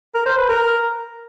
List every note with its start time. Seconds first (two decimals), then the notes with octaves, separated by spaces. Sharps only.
0.14 A#4
0.26 C5
0.38 B4
0.49 A#4